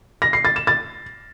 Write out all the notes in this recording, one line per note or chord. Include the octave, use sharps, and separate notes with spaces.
A#6
C7
A6
E7
A6